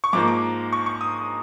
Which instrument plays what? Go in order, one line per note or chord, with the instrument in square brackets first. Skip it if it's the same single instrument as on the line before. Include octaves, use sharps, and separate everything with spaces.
[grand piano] C#6
G#2 F3 A#3 D6
D6
C#6
C#6
D#6